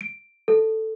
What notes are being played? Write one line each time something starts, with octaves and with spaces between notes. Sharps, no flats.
D7
A4